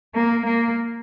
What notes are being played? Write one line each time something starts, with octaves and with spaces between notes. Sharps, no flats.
A#3
A#3